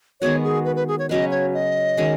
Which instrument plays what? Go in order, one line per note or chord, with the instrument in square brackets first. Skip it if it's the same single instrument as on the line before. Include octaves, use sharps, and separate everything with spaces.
[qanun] D#3 G#3 B3 F#4 [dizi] C#5
[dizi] G#4
B4
B4
G#4
C#5
[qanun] C#3 F#3 C#4 B4 [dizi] D#5
[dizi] C#5
D#5
[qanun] D#3 G#3 C#4 F#4